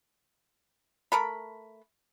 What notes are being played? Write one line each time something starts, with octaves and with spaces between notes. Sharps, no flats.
A3 A#4 B5